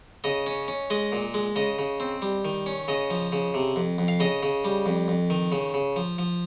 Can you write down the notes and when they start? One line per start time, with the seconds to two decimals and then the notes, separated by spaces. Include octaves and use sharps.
0.24 C#3 D#5
0.47 C#4
0.68 C#4
0.90 G#3 D#5
1.12 A#2
1.34 G#3
1.56 C#3 D#5
1.78 C#3
2.00 C4
2.22 G3
2.45 D#3
2.66 C#4
2.88 C#3 D#5
3.10 F3
3.32 C#3
3.54 C3
3.76 F2
3.98 F2
4.08 F5
4.20 C#3 D#5
4.43 C#3
4.65 G3
4.86 F2
5.08 F2
5.30 D#3
5.52 C#3
5.74 C#3
5.96 F3
6.18 F3